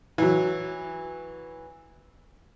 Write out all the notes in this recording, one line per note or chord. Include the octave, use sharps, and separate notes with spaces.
E3 F#3